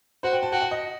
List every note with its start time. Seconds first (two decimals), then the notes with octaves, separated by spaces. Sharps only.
0.23 F#4 C5
0.33 G5
0.43 A5
0.52 F#4 G5
0.62 F#5
0.71 D#5